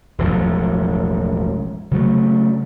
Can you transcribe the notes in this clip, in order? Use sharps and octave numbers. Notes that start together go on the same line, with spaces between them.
E1 A1 F3 F#3
C#3 F#3 A3